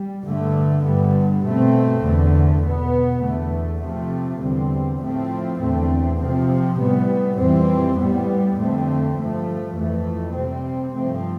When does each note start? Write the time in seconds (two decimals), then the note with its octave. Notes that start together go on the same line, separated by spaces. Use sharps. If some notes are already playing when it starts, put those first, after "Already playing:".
Already playing: G3
0.24 G2 D3 A3
0.84 G2 D3 G3 B3
1.43 B2 A3 C4
2.03 E2 D3 A3
2.62 B2 B3
3.23 E2 D3 A3
3.81 C3 F3 A3 C4
4.41 E2 D3 G3 C4
5.00 A2 F3 A3 C4
5.60 E2 D3 A3 C4
6.19 C3 F3 C4
6.79 A2 G3 B3
7.37 F2 E3 G3 C4
7.97 A2 G3 B3
8.57 F2 D3 A3 C4
9.16 G2 F3 A3
9.75 F2 E3 A3
10.35 C3 G3 C4
10.94 G2 F3 A3 C4